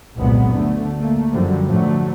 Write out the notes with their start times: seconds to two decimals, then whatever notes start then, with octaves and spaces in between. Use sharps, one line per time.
0.16 G1 C2 A#2 F#3 G#3 B3
0.51 D2 D3 A3
0.99 A3 A#3
1.32 F#2 D3 F3 G3
1.65 A2 D3 F3 F#3 A3